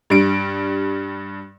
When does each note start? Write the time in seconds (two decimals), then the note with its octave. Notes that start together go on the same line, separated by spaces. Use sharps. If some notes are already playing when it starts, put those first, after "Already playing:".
0.10 G2 G3 D7